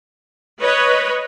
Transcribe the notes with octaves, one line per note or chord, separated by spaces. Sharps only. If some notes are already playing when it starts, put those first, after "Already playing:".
B4 C#5 D#5